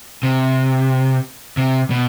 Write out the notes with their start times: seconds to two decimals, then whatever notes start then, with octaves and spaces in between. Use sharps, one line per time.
0.23 C3
1.57 C3
1.90 B2